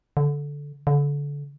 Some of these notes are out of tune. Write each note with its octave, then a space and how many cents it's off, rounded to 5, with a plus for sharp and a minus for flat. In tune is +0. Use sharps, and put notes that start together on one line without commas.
D3 -15
D3 -30